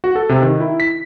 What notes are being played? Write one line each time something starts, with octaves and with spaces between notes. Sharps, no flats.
F#4
A4
C3
D#3
E4
B6